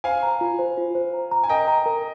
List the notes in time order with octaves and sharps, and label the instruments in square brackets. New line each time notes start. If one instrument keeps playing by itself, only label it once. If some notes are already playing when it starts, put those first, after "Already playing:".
[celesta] C5 [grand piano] F5 G#5
[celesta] A#5
F4
C5
F4
C5
A#5
A#5
[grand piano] G#5
[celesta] A#4 [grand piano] D#5 G5
[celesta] A#5
A#4